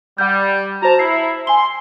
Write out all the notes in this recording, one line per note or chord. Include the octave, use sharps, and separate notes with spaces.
G3 F#5 G6
F#4 C5 A5 A#5
E4 C7
G#5 C6 G7